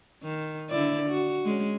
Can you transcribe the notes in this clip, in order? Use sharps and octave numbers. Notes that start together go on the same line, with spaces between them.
D#3
D3 E4 D5
F#4
G#3 C#4